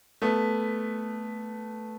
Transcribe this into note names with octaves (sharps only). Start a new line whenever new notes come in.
A3 B3